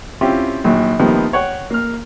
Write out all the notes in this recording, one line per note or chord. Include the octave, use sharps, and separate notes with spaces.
C4 C#4 E4 F4 G4
A#1 A#2 D#3 F#3
C3 D#3 F3 G3 A#3 B3
C#5 F#5 G5
A#3 F6